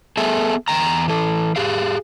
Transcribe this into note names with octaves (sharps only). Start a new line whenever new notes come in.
B3 G#4 A4 E5 G#5
E2 A3 G5 A#5
E3 A4
G4 G#4 F5